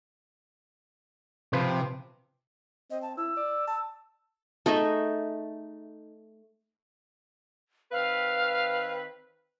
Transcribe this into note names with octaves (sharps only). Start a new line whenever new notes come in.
C3 F3 B4 C5
C4 D#5
A5
E4 E6
D5
A5
A3 D#4 G#4 E5
D#3 C4 B4 F5